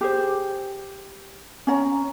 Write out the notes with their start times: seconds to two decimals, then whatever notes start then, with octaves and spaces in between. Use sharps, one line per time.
0.01 G4 G#4 C5
1.67 C#4 C#5 A#5